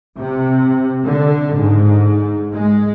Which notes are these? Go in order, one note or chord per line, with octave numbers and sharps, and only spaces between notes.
C3
D3
G#2
G#3